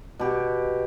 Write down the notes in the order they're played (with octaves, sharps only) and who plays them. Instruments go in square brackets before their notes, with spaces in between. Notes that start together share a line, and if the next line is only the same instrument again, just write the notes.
[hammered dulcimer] B2 G4